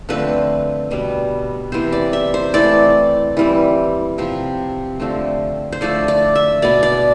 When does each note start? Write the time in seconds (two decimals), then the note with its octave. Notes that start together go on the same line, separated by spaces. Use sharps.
0.09 D3 F3 A3 C4 B4
0.91 B2 G3 B3
1.72 C3 E3 B3 C5
1.92 D5
2.13 E5
2.34 C5
2.54 E3 A3 C4 D5
3.37 E3 G3 C4
4.18 C3 F3 C4
5.00 D3 F3 A3 C4
5.72 C5
5.81 D3 F3 A3 D5
6.08 D5
6.36 E5
6.62 B2 B3 D5
6.83 D5